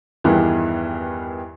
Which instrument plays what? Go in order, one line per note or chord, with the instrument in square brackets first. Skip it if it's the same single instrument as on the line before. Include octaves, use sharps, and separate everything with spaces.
[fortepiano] E2 G2 D#3 E3